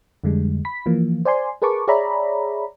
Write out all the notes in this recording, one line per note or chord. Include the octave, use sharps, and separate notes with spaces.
F2 D3 G3 G#3
B5 B6
E3 F3 A#3
C5 D5 G#5 C6
G#4 A#4 B4 A5 C#6 D6
G#4 C#5 D5 E5 A#5 B5